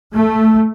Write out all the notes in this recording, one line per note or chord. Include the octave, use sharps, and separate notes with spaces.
A3